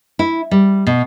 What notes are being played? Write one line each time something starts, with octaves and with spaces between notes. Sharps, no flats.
E4
G3
B2